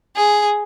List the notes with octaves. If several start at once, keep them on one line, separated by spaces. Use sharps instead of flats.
G#4